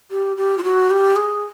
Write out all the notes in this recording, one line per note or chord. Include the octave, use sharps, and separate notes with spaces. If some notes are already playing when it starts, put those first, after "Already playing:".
G4
G4
F4
F#4
G4
G#4